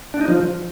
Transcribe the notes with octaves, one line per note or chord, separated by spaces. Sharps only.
D4
D#4
F3